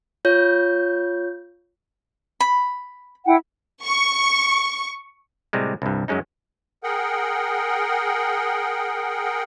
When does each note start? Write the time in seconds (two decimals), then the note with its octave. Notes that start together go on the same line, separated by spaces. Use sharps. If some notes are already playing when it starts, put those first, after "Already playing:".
0.25 F4 C#5 G6
2.40 B5
3.26 E4 F#5 G5
3.85 C#6
5.53 A2 C3 G3 G#3
5.82 C2 G2
6.08 F#2 F#3 G#3 C#4 D#4
6.83 G#4 A#4 F#5 G5